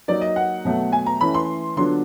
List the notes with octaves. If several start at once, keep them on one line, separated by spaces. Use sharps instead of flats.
F#3 A#3 D#4 D5
D#5
F#5
B2 F#3 A3
G#5
A#5
E3 A3 C#4 E4 B5
C6
D3 F#3 B3 D4 F4 C6